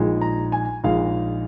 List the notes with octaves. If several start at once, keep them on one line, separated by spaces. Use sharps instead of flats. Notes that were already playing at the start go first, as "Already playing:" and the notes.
Already playing: A#1 A#2 G#3 D#4
A#5
G#5
A#1 A#2 G#3 D#4 F5